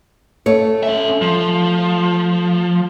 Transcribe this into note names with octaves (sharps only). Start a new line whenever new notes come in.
A3 C#5
C#4 E5
F3